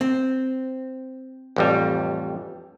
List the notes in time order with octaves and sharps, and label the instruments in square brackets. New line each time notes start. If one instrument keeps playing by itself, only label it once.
[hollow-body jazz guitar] C4
[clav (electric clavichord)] A1 F2 G3